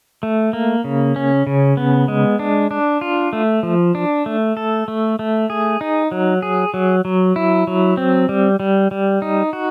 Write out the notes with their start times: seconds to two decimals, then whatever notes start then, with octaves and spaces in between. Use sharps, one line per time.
0.23 A3
0.53 A#3
0.84 C#3
1.16 C#4
1.47 C#3
1.77 B3
2.08 G#3
2.39 D4
2.71 D4
3.01 F4
3.33 A3
3.63 F3
3.95 D4
4.26 A3
4.57 A4
4.88 A3
5.19 A3
5.50 G#4
5.81 D#4
6.12 F#3
6.42 G#4
6.74 F#3
7.05 F#3
7.36 E4
7.67 F#3
7.97 C4
8.29 G3
8.60 G3
8.91 G3
9.22 D#4
9.53 F#4